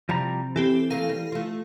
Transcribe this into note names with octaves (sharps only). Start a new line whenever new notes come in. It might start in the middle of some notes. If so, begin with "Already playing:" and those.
C3 F3 G3 E4 A#5
E3 C4 G4 A4
A3 A#3 F5 A#6 D#7
G3
A3 F4